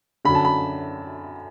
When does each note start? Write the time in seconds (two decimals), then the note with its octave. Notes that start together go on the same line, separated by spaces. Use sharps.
0.25 F#2 D3 B5
0.35 A5
0.45 B5